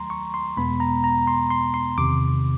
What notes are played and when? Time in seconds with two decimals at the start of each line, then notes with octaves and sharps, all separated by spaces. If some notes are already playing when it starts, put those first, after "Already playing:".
Already playing: D#2 D#3 F#3 A3 A#5 C6
0.10 C#6
0.34 C6
0.57 E2 B2 G#3 B3 B5
0.80 A#5
1.04 A#5
1.27 C6
1.50 C6
1.74 C6
1.97 E2 C3 D#3 D6